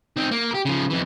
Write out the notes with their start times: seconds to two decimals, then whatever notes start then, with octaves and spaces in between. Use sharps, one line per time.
0.17 C4 D#4
0.31 A#3
0.51 G4 A#4
0.65 C#3 F3
0.90 F2 E3